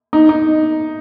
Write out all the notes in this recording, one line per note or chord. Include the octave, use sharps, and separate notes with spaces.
D#4
D#4